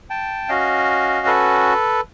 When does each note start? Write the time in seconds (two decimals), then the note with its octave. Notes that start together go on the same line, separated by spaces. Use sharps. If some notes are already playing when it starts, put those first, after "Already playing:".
0.10 G5 A5
0.49 C#4 F#4 D#5 F5
1.27 A4 B4